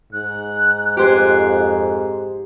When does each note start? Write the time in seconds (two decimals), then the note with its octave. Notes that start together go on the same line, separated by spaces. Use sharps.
0.13 G#2 F#6
0.97 F2 G4 C5 G#5